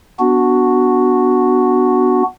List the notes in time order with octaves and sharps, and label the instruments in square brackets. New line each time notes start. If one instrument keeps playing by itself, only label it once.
[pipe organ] B3 D4 F#4